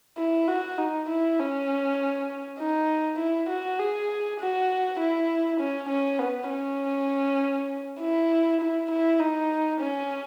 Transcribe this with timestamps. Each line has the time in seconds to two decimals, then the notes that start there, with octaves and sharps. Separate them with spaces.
0.18 E4
0.48 F#4
0.78 D#4
1.09 E4
1.39 C#4
2.59 D#4
3.19 E4
3.49 F#4
3.79 G#4
4.40 F#4
4.99 E4
5.60 C#4
5.89 C#4
6.19 B3
6.50 C#4
8.01 E4
8.61 E4
8.91 E4
9.20 D#4
9.80 C#4